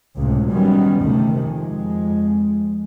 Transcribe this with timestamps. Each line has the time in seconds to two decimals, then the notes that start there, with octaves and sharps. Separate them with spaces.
0.17 C#2 A2 C3
0.50 D#3 F#3 G3 B3 C#4
1.01 D2 C3 D#3 A3
1.42 F2 G#3